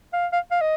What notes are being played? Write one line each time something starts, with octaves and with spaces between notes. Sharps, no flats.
F5
F5
F5
D#5